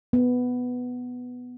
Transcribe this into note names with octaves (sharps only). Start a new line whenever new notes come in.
B3